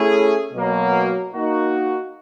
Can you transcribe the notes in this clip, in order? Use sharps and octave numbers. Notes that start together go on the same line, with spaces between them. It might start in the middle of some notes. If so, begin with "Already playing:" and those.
Already playing: A3 C#4 E4 G#4
B2 F#3 A#3
A#3 D#4 F#4